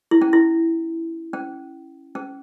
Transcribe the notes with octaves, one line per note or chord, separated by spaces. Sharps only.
E4
C#4
E4
C#4
C#4